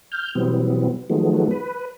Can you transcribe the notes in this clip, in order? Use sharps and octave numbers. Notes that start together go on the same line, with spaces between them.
F6 G6
B2 E3 F#3 G3 B3 C4
D#3 F3 F#3 G#3 A3 B3
B4